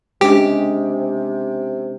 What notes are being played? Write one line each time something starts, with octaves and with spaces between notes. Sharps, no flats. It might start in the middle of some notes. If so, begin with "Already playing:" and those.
C3 G#3 C#4 D4 G4